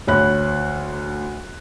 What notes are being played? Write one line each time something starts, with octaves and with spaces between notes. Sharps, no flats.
D2 C#5 B5 F#6